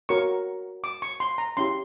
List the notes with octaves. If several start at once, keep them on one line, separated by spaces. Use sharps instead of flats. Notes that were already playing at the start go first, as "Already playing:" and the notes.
F#4 A#4 C#5 C#6
D6
C#6
C6
A#5
C#4 E4 G4 C6